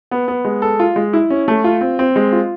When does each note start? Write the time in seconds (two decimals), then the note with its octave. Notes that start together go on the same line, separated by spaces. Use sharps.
0.11 B3
0.28 B3
0.45 G#3
0.62 A4
0.80 F4
0.96 G#3
1.13 E4
1.30 C#4
1.48 A3
1.64 F4
1.81 C4
1.99 C4
2.16 G#3
2.32 F4